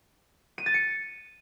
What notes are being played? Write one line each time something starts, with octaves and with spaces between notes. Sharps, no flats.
D#7
A6
C#7